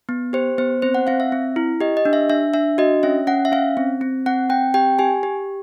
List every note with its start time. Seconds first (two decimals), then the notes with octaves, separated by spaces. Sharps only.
0.09 B3
0.33 G4 C5
0.58 B3 C5
0.82 C4 C5
0.95 F#5
1.07 C4 F5
1.20 E5
1.32 C4
1.56 E4
1.81 G4 D#5
1.97 D#5
2.05 D4
2.13 E5
2.30 D4 E5
2.54 D4 E5
2.78 F#4 D#5
3.03 C#4 E5
3.27 C#4 F#5
3.45 E5
3.52 C#4 F5
3.77 C4
4.01 C4
4.26 C4 F#5
4.50 C4 G5
4.74 G4 G5
4.99 G4 G#5
5.23 G4